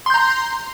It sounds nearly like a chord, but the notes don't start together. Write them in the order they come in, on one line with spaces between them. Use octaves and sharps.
C6 G6 A#5